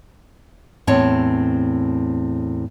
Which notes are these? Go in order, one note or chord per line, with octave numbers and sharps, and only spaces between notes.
E2 A2 C4 C#5 A5